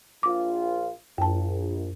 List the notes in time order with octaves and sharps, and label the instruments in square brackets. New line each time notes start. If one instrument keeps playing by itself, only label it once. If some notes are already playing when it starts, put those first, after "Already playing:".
[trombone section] A#1 F4 [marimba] D6
[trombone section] A#1 [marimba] F#2 A5